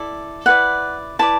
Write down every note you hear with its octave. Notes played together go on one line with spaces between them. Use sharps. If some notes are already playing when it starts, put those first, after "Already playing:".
Already playing: E4 A4 D5
E4 B4 D5 F#5
E4 B4 D5 A5